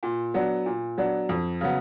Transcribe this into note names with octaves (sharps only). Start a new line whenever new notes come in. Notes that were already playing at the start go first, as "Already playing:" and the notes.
A#2
F#3 B3 D4
A#2
F#3 B3 D4
F2
C#3 F#3 B3